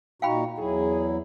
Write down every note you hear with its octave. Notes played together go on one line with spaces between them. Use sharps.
A#2 D#4 F#4 F5 G5 B5
E2 F#3 E4 G#4